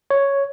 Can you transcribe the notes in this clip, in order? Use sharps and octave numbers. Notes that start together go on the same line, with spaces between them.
C#5